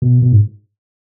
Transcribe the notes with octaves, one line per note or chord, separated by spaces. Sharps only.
B2
B2
G#2